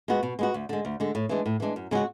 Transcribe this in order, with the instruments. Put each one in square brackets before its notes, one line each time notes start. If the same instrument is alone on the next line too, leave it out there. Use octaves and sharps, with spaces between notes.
[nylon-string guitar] G#3 B3 F#4
B2
G#3 B3 F#4
D2
D3 G#3
D2
D3 G#3
A2
E3 G#3 D4
A2
E3 G#3 D4
F#2
C#3 G#3 C#4 F#4